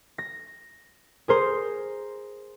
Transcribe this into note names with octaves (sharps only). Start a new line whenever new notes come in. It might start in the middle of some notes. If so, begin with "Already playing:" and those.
A#6
G#4 A#4 C5